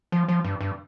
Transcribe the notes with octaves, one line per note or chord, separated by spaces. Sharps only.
F3
F3
G2
G2